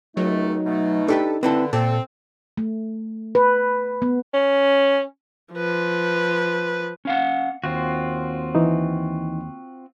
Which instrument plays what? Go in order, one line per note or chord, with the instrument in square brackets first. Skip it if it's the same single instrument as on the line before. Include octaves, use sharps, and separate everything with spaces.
[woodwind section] C#2 D#3 A3 [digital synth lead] F#3 [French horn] D#4
[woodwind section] B2 A3
[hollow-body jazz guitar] D4 G4 B4 [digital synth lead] A4
[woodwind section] D3 [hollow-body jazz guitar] C4 E4 A4 [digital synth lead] B4
[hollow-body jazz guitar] A#2 [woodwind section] C4 [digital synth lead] A4
[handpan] A3
B4
B3
[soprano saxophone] C#4
[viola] F3 B4
[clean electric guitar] C#4 F5 F#5
[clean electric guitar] D#2 [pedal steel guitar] C4 F4 F#4
[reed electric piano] E3 D#4